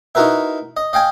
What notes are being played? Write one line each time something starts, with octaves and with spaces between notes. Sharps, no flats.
D#4 E4 F#4 A#4 B4 E5
D#5
D#5 F5 G5 G#5